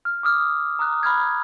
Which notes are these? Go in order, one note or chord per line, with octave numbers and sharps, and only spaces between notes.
F6
D6 D#6 F6
A#5 D#6 F#6
B5 F6 G#6